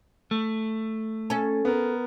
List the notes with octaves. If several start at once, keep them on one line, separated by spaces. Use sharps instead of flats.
A3
C#4 A4
B3 A#4